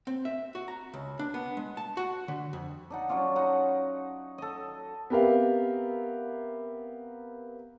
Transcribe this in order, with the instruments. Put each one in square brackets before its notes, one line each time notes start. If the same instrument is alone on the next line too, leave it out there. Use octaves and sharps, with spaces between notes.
[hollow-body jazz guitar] C4
E5
F#4
A#5
C#2
D4
B3
G#3
A5
F#4
D3
F2
[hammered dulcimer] D4 D#4 F#5
F#3 C#4 D4 F4
D#4 D#5 F#5
A4 D#5
[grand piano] B3 C4 G4 A#4 E5 F5